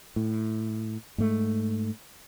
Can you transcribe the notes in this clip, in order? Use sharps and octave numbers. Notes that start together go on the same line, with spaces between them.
A2
G#2 A3